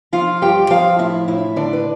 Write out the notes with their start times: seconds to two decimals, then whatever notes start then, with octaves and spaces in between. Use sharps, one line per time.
0.13 F3 F4 F5
0.42 G2 G4 G5
0.70 F3 F4 F5
0.99 A2 E4 E5
1.28 A2 E4 E5
1.56 D3 D4 D5
1.73 B4